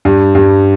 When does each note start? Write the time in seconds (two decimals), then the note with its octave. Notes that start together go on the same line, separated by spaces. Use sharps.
0.05 G2
0.35 G2